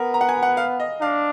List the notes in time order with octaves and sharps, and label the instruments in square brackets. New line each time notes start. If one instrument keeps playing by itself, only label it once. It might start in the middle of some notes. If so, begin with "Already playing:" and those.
Already playing: [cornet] B3 [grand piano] A#4
[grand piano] A#5
F#5
G#5
F#5
F5
D#5
[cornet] D4 [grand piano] F5